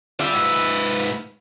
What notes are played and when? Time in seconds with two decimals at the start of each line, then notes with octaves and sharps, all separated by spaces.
0.20 F4 G#4 D5 E5 G5
0.33 G#2 B4